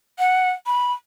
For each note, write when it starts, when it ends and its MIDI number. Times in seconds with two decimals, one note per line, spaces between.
0.19 0.51 78
0.67 0.92 83